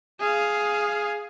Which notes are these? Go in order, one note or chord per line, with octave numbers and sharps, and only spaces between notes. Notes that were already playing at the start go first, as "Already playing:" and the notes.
G#4 F5